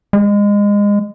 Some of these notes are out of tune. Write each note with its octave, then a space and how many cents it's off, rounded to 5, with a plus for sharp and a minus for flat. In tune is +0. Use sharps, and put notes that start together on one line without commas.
G#3 -25